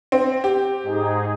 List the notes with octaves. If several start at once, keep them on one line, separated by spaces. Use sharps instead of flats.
C4
G4
G#2 D#4 G#4